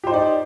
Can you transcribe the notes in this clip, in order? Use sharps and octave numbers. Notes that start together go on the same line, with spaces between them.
D#4 G4 C5 D5